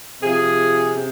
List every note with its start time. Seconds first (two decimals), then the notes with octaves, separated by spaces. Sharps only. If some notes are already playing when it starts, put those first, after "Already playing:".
0.22 C3 F3 G#4
0.96 C3